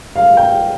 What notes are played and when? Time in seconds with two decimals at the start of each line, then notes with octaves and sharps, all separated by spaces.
0.16 F5
0.37 G5